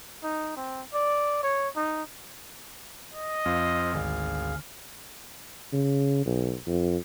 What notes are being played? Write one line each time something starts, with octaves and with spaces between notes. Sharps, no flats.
D#4
C4
D5
C#5
D#4
D#5
F2 F4 C5 F5
G#1 D2 G#4 F5
C#3
B1
F2